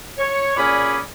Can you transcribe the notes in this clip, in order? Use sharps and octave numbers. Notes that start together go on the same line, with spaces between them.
C#5
A#2 C#4 G#4 D5 G#5 B5